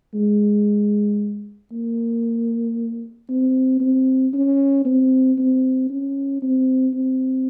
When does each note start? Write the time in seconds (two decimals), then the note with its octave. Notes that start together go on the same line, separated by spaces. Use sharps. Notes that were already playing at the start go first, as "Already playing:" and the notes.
0.14 G#3
1.72 A#3
3.29 C4
3.80 C4
4.34 C#4
4.85 C4
5.38 C4
5.91 C#4
6.42 C4
6.95 C4